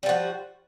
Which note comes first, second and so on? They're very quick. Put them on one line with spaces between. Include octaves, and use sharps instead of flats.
G3 F3 F#4